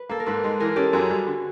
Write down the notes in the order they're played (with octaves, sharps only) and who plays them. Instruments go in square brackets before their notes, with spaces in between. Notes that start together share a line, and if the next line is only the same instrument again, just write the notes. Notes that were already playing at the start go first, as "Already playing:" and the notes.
Already playing: [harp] B4
[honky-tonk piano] A#3 [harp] A4
[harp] A#4
[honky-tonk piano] G#2 [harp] A4 B4
[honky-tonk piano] G#3
[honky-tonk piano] E3 [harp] G#4 A#4
[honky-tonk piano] C#4 [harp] G4 A4
[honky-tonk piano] F#2 [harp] F#4 G#4
[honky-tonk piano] G3
D3